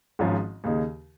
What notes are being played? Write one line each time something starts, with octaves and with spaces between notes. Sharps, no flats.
G#1 G#2 F3 C#4
D#2 C#3 A#3 D#4